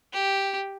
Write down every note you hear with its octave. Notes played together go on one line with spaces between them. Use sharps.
G4